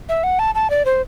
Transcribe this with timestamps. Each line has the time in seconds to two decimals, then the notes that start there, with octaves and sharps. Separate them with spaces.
0.09 E5
0.23 F#5
0.39 A5
0.55 A5
0.70 D5
0.85 C5